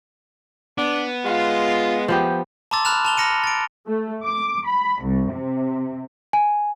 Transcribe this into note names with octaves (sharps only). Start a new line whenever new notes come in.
B3 D4
G#3 F4
F3 B3 G4
A5 A#5 C6 D6 E6 A6
A#5 B5 F6 F#6 E7 F7
A5 F7 G7
B5 F6 A#6 C#7 D#7
A6 D7
A3
D6
B5
C2
C3
G#5